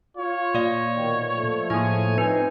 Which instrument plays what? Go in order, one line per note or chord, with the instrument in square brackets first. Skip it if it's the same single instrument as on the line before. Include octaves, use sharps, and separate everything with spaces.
[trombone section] F4 [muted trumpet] C#5
[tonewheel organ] A#2 [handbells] A#3 D5 F5
[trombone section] B2 D#3
F3 A3
[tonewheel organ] A2 C#5 G#5 [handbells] A#3 E4 [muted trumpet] G#4
[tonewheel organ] C4 D#4 [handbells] B4 [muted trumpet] G#5